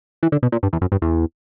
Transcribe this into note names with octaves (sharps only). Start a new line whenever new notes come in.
E3
D3
B2
A#2
G2
E2
F#2
G2
E2